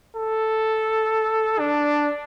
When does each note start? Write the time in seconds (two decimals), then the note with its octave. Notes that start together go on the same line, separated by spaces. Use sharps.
0.16 A4
1.59 D4